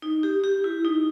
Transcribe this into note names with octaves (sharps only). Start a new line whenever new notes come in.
D#4
G4
G4
E4
D#4